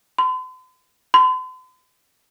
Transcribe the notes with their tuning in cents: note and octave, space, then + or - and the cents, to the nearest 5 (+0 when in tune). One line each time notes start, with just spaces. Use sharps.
C6 -45
C6 -45